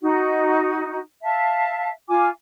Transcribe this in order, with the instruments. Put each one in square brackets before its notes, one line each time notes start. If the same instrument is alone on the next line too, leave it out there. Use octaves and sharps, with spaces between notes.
[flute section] D#4 F#4
E5 F5 A5
F4 G#5 D6